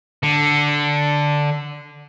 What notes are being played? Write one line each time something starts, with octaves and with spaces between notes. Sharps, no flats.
D3